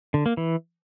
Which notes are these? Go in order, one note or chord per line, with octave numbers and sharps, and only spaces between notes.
D3
A#3
E3